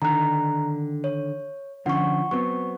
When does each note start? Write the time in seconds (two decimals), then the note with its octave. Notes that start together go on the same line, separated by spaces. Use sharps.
0.02 D3 D#3 A#5 F#6
1.04 C#5
1.86 D3 F3 C#4 F#5 C#6
2.31 F#3 B3 C4 C#6